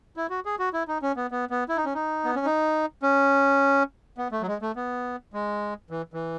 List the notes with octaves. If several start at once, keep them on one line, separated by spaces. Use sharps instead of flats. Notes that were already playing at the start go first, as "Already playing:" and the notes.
E4
F#4
G#4
F#4
E4
D#4
C#4
B3
B3
B3
E4
D#4
C#4
D#4
B3
C#4
D#4
C#4
B3
A3
F#3
G#3
A3
B3
G#3
E3
E3